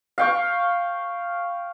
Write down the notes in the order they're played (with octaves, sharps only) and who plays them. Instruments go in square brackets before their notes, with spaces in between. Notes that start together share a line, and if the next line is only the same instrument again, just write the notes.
[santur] F5 G5 C#6